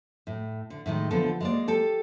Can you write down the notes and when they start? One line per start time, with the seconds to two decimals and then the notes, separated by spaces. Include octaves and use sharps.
0.27 A2
0.70 D3
0.86 A2 D#3 G#3
1.11 D3 F3 B3 F4 A4
1.40 G#3 A#3 D5
1.68 G4 A4